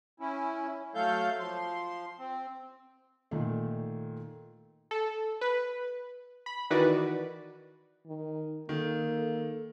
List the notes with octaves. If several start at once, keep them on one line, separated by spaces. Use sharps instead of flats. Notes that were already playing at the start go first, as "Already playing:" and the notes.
C#4 E4
F#3 A3 A4 F5 G6
F3 C6
C4
A#2 D#3 A3
A4
B4
B5
D#3 E3 F#4 B4 D5
D#3
D#3 A#3 A4